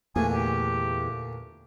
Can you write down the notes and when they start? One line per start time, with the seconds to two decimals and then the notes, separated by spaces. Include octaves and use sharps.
0.16 E2 A#2 D3 A3 A#3 G#5
0.33 G4